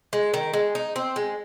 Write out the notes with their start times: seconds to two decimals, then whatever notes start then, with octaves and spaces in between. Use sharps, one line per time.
0.13 G#3
0.34 D#3
0.53 G#3
0.75 D#4
0.96 C4
1.16 G#3